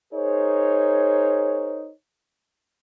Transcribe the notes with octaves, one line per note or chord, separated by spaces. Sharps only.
D#4 G#4 A#4 C5 C#5